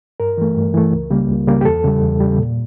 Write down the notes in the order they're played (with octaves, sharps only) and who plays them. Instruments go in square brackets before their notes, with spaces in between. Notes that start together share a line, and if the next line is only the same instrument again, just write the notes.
[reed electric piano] G2 A#4
E3 A3
G2
E3 A3
C#2
C#3 G3 A#3
C#2
C#3 G3 A#3
G4
E2 A4
C#3 G3
E2
C#3 G3
A#2